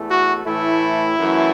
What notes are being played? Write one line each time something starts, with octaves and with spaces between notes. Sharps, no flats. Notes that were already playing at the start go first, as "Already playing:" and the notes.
Already playing: E2 E3 A3
F#4
A2 E3 A3 E4
F#2 E3 A3